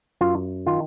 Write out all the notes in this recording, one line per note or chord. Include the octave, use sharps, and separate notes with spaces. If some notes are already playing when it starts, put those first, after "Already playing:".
F#2 F4
D#3 F4